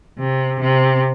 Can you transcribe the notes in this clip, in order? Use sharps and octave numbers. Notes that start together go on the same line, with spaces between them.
C3
C3